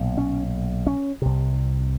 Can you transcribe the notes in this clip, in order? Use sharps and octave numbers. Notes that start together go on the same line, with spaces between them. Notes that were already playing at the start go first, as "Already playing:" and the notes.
Already playing: B1 A#2
C#4
C#4
C2 C3